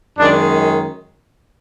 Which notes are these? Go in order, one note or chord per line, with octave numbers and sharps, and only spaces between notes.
F#2 D#3 G#3 D4